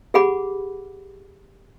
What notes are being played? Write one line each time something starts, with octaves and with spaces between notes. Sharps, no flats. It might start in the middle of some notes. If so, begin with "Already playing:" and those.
G4 G#4 F#5 B5 D6